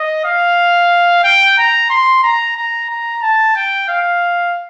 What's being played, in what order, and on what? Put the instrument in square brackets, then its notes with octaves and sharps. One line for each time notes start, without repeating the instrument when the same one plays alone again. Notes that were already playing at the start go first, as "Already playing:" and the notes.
Already playing: [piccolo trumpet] D#5
F5
G5
A#5
C6
A#5
A#5
A#5
A5
G5
F5